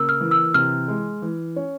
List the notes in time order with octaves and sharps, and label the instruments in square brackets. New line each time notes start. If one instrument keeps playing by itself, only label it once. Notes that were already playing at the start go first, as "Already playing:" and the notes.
Already playing: [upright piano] C#3 A#3 [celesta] E6
[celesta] F6
[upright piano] E3
[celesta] E6
[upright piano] C3 [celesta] F6
[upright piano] G#3
E3
C#4